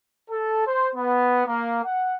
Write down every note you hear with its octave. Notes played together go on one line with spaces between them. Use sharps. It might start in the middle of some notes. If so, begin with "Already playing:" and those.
A4
C5
B3
A#3
F#5